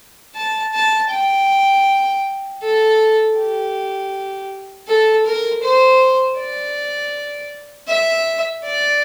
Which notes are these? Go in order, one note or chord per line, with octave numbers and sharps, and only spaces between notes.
A5
A5
G5
A4
G4
A4
A#4
C5
D5
E5
D5